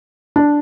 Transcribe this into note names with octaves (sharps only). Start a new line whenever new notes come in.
D4